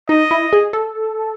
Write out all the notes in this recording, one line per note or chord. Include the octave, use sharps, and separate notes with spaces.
D#4 D#5
E4
G#4
A4